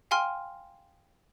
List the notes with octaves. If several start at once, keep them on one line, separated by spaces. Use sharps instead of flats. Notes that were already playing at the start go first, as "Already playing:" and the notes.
F5 G5 G#5 C6 F6